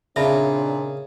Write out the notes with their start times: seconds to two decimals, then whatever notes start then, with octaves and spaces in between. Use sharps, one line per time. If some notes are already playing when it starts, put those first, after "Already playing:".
0.16 D#2 A#2 C#3 C4 D4 E5 A5 B5